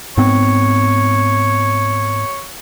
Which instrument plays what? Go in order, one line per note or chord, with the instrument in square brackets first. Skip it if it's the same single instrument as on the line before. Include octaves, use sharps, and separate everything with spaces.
[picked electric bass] G#2 B3 C4 [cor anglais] C#5